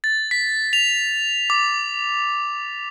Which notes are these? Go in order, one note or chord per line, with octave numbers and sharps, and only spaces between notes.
A6
B6
F7
D6